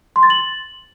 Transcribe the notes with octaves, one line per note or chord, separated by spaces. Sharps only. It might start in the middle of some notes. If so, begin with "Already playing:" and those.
C6
A6
F#7